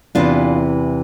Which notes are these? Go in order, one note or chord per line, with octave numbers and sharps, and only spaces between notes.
E2 C3 E3 D4 F4